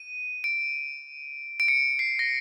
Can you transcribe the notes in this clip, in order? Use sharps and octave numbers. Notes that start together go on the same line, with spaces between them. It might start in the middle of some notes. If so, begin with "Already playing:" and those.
Already playing: D#7
D7
D7
C#7
C7
A#6